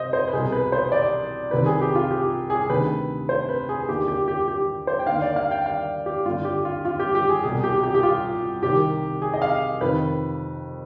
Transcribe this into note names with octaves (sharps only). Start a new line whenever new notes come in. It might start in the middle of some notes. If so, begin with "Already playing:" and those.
Already playing: C3 C5 D#5
C5
B4
C2 B2 G#4
B4
C5
D5
C2 C3 D#3 B4
G#4
G4
F4
G4
G#4
D2 C3 D#3 B4
C5
B4
G#4
D#2 D3 G4
G4
G4
G4
C5
G5
D#2 D3 F5
D5
F5
G5
F5
G4
G2 D3 F4
G4
F4
F4
G4
G4
G#4
C2 B2 G#4
G4
G4
G4
F4
C2 C3 D#3 G4
G#4
D#5
F5
F2 C3 D#3 B4